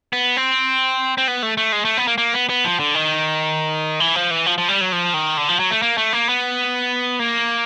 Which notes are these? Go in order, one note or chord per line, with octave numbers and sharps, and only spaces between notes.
B3
C4
C4
B3
A3
A3
G#3
A3
B3
A#3
A#3
B3
B3
F3
D3
D#3
E3
F3
E3
F3
F3
G3
F#3
F3
D#3
D3
F3
F#3
A3
A#3
A3
A#3
B3
A#3